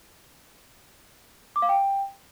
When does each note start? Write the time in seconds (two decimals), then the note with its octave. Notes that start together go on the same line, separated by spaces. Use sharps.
1.56 D6
1.62 F5
1.69 G5